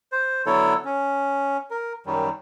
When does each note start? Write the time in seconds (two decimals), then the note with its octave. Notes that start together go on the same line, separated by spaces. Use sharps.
0.12 C5
0.46 D3 F#3 B3 E4 A4 C#5
0.85 C#4
1.71 A#4
2.06 F#2 D#3 F#3 G3